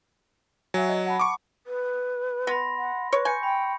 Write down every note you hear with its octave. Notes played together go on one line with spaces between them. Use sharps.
F#3 E5 F#5 G#5
D#5
F#5 A5 B5
C#6 D6
B4
B3 B5 C6 A#6
F#5
B4 C#5
G#5 C#6 G6 C#7
G5 B5